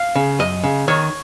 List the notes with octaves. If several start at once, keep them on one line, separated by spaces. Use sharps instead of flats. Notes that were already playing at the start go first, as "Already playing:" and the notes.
Already playing: F5
C#3
F#2 D#5
C#3
D#3 C#5